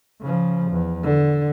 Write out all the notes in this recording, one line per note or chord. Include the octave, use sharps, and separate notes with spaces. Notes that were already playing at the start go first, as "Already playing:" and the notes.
C#3 F3
E2
D3